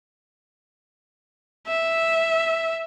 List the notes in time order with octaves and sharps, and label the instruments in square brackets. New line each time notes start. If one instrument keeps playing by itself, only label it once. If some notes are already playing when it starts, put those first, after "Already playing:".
[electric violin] E5